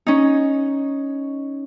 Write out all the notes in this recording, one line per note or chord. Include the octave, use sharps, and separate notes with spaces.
C#4 D#4